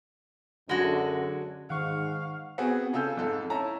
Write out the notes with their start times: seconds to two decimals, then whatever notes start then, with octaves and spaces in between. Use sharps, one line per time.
0.69 F#2 D3 G#3 F#4
1.70 G#2 D#3 F5 F#5 C#6
2.58 B3 C4 F#4 G#4
2.93 C#3 F4 A4 G#5 E6 G6
3.17 F2 G#2 A4 F5
3.50 C#4 E4 A5 A#5